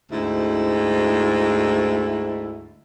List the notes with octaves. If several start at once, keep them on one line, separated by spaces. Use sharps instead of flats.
D2 G#2 E4